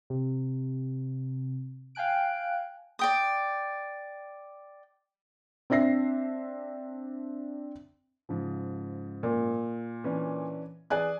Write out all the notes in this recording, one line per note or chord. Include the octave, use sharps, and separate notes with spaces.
C3
F5 G5 G#5 F#6 D7
D5 G5 D#6
C4 D4 E5 A#6 C7
G#2 C#3 F3
A#2
E3 C#4 D4
E3 G#4 D5 G#5 F#6